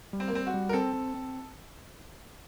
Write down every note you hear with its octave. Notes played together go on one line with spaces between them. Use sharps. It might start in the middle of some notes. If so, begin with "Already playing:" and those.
G3
C4
A#3
G3 C4
F#4
G3
A#4
C4 A4
C4
C4